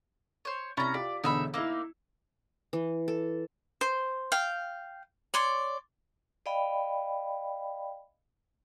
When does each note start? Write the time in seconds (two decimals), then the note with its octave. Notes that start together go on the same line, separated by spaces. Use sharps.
0.45 C5 C#5
0.77 C2 C#4 A#5 B5 A6
0.94 F4 G4 D5 B6
1.24 E1 B2 D3 D#4 E5 B5
1.54 A#3 D#4 E4 E6
2.73 E3
3.08 A4
3.81 C5
4.32 F5 G5
5.34 C#5 D5 C6
6.46 D5 D#5 F5 G5 B5